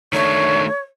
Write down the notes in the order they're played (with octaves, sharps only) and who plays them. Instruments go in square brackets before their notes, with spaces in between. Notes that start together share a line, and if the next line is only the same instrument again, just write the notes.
[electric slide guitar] D#3 A3 D4 [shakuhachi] C#5